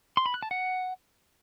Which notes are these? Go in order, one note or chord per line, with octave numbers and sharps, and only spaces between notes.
C6
B5
F#6
A5
F#5